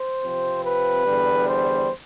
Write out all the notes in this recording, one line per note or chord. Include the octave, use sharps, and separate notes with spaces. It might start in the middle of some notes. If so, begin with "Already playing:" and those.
Already playing: C5
C3 F3 C4
B4
E2 D3 G3
C5